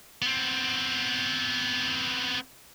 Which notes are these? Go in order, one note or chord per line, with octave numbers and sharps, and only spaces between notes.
B3 C4